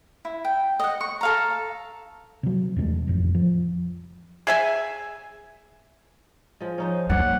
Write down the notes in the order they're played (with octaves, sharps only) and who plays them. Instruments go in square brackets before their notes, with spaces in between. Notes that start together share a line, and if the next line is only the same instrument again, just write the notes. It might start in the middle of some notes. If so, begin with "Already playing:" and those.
[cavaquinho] E4
G5
D#5 F#5
C#6
A4 F5 A#5
[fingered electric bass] C3 F#3
E2 C3 G#3 A3
A1 F2
F3
[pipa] G#4 E5 G#5
[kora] F3 G#3
[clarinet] F3 [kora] C#4 D#4 C5
[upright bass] G3 A#3 [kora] C#5 D5 [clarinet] F#5